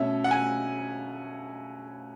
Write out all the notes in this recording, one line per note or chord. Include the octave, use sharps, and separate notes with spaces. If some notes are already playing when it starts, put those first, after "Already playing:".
Already playing: B2 A3 C#4 E5
F#5
G#5